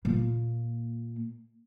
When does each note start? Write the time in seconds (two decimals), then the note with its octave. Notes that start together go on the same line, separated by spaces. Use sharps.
0.05 A#2 A#3